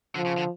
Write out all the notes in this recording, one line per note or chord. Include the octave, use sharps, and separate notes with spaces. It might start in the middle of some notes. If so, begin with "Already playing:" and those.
D3 F3
C#3
D3